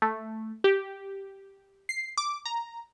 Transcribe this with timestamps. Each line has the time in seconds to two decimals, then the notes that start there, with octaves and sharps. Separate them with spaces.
0.02 A3
0.64 G4
1.89 C7
2.18 D6
2.45 A#5